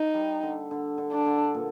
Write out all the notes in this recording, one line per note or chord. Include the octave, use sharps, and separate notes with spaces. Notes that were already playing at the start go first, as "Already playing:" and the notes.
Already playing: D#4
G3
D3
D3
D3
D4
D3
A#2